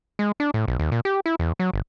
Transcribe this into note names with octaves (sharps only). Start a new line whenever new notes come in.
G#3
D4
A2
B1
D#2
A#2
G4
E4
E2
F#3
G1